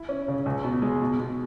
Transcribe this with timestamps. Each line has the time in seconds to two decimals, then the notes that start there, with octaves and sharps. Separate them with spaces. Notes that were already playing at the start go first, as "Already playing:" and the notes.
Already playing: E4
0.09 C#4
0.28 C#3
0.46 C#2
0.64 B2
0.82 G#3
1.01 B2
1.19 B2